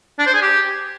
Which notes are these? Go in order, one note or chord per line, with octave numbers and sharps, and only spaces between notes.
D4
C5
G#4
G4